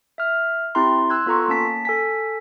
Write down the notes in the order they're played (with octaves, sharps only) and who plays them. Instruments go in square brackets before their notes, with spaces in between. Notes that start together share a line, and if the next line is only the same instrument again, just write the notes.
[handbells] E5 F6
C4 E4 G4 G5 A#5 C6
C6 E6 F#6 G#6
B3 F4 A4 A#5 C#6
A#3 C#4 A5 B6
A4 G#5 B6